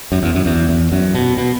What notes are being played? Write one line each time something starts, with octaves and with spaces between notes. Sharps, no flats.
F#2
E2
F#2
E2
E2
F#2
B2
B2